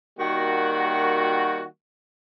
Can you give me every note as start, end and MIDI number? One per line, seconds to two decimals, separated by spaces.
0.19 1.65 51
0.19 1.65 55
0.19 1.65 58
0.19 1.65 66